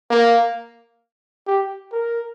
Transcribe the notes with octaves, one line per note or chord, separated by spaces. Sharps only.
A#3
G4
A#4